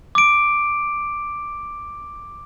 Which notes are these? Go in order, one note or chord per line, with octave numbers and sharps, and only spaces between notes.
D6 D7